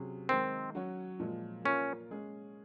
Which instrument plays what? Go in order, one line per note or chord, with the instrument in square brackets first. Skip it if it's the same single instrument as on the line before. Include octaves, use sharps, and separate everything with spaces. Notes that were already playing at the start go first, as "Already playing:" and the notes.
Already playing: [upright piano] C3 F#3 C#4 G#4
[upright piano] D#3 G#3 D#4 A#4 [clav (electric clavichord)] C4
[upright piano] F#3 C#4 F#4 C#5
A#2 F3 G#3
[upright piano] A#3 F4 A#4 C#5 [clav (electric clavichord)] C#4
[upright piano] G#3 C#4 G#4